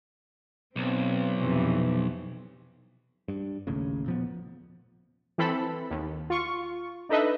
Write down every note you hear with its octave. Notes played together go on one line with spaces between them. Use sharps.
B1 C4
F2 C3 E3
G2
A1 D#2 A2 C#3
A#2 F3 B3
E3 C4 A4 B5
D#2
F4 C#6
D4 D#4 A4 B4 D#5 E5